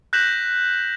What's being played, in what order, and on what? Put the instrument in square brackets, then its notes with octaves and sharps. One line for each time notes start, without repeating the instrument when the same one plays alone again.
[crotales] F#6 G6 A#6 B6 E7 F#7